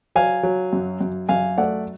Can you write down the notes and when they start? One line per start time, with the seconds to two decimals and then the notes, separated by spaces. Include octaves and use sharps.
0.15 F#3 F5 G#5
0.43 F#3
0.73 F#2
1.01 F#2
1.29 F#2 F5 G#5
1.57 A3 D5 F#5